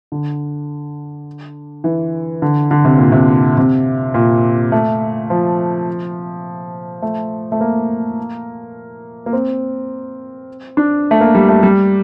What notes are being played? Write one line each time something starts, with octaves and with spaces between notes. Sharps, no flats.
D3
E3
D3
D3
C3
A#2
C3
C3
A#2
A3
F3
A3
A3
A#3
A#3
C4
D4
A3
A#3
G3
A3
G3